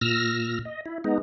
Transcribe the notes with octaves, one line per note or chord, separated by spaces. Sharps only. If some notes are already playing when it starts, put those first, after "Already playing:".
A#2 E6 F6 A#6
D#5
E4
G#3 B3 D#4